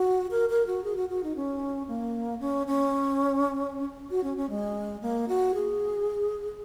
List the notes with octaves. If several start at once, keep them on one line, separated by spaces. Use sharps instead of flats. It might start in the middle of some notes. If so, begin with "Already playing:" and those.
Already playing: F#4
A#4
A#4
F#4
G#4
F#4
F#4
D#4
C#4
A#3
C#4
C#4
F#4
C#4
C#4
G#3
A#3
F#4
G#4